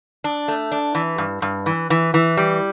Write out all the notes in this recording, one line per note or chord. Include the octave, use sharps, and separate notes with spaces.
D4
A3
D4
E3
G2
G2
E3
E3
E3
G3